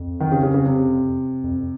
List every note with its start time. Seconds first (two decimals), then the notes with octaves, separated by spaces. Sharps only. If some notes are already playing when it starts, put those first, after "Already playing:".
Already playing: F2
0.20 D#3
0.32 C#3
0.43 C#3
0.54 C#3
0.65 C3
1.44 F2